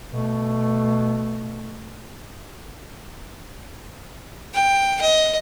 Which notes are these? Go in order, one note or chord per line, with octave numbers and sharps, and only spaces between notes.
B2 A3
G5
D#5